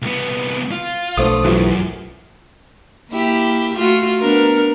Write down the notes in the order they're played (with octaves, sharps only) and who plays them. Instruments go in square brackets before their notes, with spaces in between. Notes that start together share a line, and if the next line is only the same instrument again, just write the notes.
[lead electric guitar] C2 B3
F4
[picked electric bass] B1 [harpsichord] D3 F3 A3 [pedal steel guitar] D#6
[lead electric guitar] F#2 [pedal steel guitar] E3 F4 G4
[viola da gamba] A#3 E4 G4
A3 F4 F#4
B3 D4 A#4